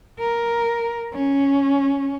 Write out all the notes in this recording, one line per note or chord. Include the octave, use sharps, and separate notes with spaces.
A#4
C#4